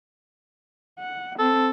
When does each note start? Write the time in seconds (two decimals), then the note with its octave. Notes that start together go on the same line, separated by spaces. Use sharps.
0.99 F#5
1.39 C4 A4